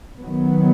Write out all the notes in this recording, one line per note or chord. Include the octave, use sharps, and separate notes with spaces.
D#3 F#3 B3